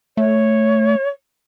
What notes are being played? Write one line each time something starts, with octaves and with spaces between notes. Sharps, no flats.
A3 C#5